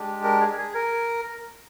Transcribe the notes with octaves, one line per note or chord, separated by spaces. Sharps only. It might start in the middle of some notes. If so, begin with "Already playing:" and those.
Already playing: G#3 D4 G4
A#4
G#4
G#4
A#4